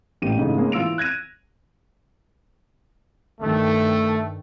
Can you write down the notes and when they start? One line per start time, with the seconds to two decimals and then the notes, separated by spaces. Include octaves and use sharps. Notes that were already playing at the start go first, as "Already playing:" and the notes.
0.22 A1 A#2 G4 D#7
0.39 G#2 C#3 E3 A3 D#4
0.57 G#3 A#3 C#4
0.72 E3 F4 E6 D7 F7
0.98 F#6 G#6 A#6 D#7
3.40 G2 D#3 A3